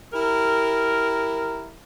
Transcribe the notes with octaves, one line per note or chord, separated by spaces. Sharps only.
E4 G4 A#4